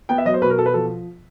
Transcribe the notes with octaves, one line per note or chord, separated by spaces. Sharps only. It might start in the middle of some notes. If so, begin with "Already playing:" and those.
B3 G5
E5
F#3 D#5
C5
B2 B4
A#4
B2 A4
B4
F3 A4